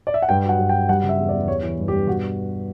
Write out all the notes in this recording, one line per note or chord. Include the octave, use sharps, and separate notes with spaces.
D5
E5
F#5
G2 G5
F#3 F#5
G2
G5
F#3
G3 F#5
C#3
E5
E2
D5
E2
G3 C#5
E3
G2
G4
G2
B2 F#4